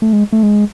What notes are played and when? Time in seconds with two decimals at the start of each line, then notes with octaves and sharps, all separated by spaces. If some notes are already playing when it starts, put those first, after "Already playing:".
0.02 A3
0.13 G#3
0.33 A3
0.43 G#3